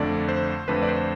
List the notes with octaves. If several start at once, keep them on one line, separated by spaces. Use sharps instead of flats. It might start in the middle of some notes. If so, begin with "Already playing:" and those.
Already playing: F2 D3 A3 D5
C5
F2 D3 A3 B4
D5
C5